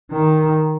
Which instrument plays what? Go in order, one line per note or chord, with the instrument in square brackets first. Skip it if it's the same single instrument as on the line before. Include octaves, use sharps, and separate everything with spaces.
[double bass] D#3